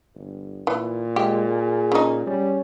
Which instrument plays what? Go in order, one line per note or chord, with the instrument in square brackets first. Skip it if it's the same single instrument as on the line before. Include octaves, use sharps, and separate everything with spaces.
[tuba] G1
[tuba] A#2 [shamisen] E3
[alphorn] G#3 [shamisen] G4
[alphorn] G#4
[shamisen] C#3 D#4
[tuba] G3 [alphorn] C#4